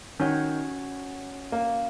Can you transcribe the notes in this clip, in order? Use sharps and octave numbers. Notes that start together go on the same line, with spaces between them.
D#3 C#4 F#4 C#5 F#5
A#3